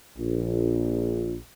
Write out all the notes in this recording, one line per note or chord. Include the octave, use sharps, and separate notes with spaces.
A#1